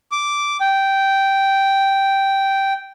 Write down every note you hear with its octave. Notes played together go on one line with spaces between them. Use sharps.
D6
G5